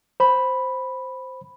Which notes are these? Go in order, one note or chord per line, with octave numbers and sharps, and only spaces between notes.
C5 B5